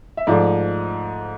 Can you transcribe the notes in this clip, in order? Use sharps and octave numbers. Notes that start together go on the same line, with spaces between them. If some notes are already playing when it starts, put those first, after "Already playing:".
E5
G#2 F3 A3 D5